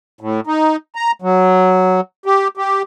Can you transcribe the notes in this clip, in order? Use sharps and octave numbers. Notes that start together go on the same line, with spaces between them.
A2
D#4
A#5
F#3
G4
G4